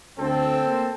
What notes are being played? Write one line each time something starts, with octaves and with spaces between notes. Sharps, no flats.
D2 C4 A4
A#3